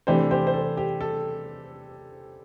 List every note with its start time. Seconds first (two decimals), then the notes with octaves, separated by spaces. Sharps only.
0.07 C3 E3 A3 D4 G4 C5
0.31 G4 C5
0.47 C5
0.53 A4
0.77 G4
1.01 A4